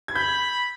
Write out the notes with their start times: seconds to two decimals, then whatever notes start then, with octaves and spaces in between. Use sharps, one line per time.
0.08 G#6
0.15 B5 G6